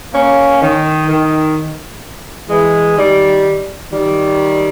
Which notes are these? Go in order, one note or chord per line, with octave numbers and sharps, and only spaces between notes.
A#3 C#4
D#3
D#3
E3 G#3
D#3 G3
D#3 G3